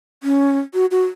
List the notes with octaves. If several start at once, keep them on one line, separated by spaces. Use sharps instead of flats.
C#4
F#4
F#4